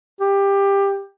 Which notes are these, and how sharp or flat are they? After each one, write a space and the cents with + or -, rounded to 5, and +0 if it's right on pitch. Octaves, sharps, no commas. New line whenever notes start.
G4 +15